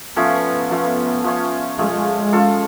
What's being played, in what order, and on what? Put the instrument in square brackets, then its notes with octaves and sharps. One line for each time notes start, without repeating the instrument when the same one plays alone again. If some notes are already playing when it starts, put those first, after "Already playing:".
[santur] F3 A3 C#4 [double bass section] B3
[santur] F3 A3 C#4
F3 A3 C#4
[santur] F3 A3 C#4 [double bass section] G#3
[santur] C#4 F4 A4